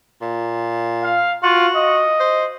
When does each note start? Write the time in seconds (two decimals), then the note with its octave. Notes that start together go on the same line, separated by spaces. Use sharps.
0.21 A#2
1.04 F5
1.43 F4 F#4
1.76 D#5
2.20 C5